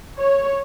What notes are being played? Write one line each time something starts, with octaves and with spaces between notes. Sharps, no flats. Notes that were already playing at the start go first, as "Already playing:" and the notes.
C#5